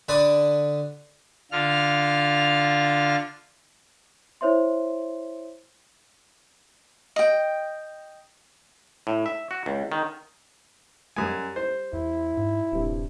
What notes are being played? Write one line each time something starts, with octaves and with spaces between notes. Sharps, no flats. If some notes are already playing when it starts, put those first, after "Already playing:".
D3 D4 B5 D#6
D3 F4 F6
E4 C5 C#5 E5 C6
D#5 G5
A2
E5
F#4
C#2
D#3
F#2 G3 G#5
C5
E2 E4
G#2
D#1 G2 C3